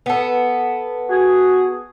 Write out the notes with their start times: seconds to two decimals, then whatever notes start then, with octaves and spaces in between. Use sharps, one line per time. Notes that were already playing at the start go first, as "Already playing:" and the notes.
0.06 B3 A4
1.09 F#4 G#4